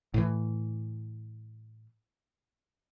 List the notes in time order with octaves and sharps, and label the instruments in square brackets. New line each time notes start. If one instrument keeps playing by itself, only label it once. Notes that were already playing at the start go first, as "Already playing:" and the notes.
[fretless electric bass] A2 E3